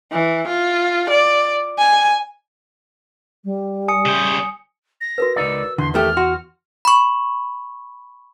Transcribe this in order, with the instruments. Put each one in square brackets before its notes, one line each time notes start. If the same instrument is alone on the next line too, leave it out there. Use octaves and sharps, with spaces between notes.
[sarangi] E3
F4
D5
G#5
[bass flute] G3
[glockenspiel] G#5 D#6 C#7
[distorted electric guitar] C#3 C5
[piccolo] A#6
[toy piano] F#4 A#4 B4
[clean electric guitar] C#2 D#4 D5 [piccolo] E6
[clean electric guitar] E2 [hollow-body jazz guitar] D3 [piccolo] C6
[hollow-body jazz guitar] D#3 A3 G4 [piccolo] F6
[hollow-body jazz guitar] F#4 [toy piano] C6
[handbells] B5 C#6